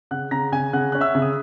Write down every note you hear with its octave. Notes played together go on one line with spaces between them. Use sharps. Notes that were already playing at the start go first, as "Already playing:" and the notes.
C#3 F#5 F#6
C#3 A#5 A#6
C#3 G#5 G#6
C#3 F#5 F#6
C#4 F#6
E5 E6
C#3
D#6